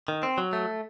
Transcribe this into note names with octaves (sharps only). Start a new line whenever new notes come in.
D#3
C4
F#3
A3